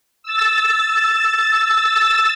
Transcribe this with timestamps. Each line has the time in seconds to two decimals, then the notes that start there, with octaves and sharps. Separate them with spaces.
0.23 E6 A6